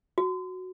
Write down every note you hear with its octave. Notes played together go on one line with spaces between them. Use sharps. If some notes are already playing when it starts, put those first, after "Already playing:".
F#4